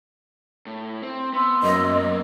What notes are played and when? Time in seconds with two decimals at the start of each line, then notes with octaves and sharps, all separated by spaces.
0.66 A2
1.02 C4
1.33 B3 E5 C6 E6
1.63 F#2 A#3 B3 D#5